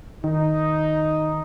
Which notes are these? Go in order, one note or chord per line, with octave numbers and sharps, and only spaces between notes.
D#3 D#4